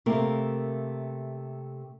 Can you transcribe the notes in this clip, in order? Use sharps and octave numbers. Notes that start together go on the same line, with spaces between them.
C3 A3 A#3 A#4